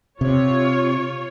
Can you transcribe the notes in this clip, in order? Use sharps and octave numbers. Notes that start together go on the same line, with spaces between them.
C3 F4 C#5